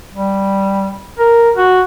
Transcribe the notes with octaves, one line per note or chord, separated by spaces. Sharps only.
G3
A#4
F#4